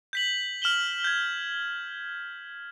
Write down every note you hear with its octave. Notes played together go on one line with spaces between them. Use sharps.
G6 B6 F#7
F6 E7 F#7 G7
G6 G#6